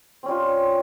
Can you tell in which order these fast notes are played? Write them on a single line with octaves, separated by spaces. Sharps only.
C4 C#4 G3 F4